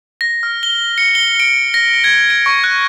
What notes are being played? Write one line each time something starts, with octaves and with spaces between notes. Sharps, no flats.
A#6
F6
G7
C#7
G7
D7
A#6
G#6
D7
C#6
F#6